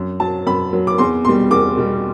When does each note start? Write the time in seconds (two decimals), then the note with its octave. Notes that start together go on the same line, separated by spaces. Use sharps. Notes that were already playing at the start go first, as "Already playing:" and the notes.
Already playing: F#2
0.20 F#3 A5
0.47 F#2 B5
0.73 F#3
0.87 D6
0.98 E2 C6
1.25 B2 G3 C6
1.51 E2 D6
1.77 B2 G3